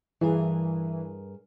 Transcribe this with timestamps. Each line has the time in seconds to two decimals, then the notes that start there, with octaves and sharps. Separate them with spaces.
0.21 G2 E3 G#4 A#4